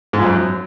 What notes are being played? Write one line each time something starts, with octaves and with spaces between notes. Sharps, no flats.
G#2
F2
F#2